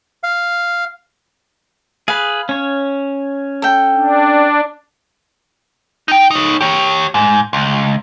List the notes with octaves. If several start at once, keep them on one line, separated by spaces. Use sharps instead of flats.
F5
G#4 B4 F5
C#4 C#5
A4 G5
D4
D#4 G5
D#4 C#5
G4 C#5
G#2
C#2